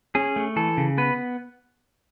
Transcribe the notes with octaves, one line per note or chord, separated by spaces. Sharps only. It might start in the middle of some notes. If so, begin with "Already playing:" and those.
C#4 G#4
A3
E3 A4
C#3
B3 B4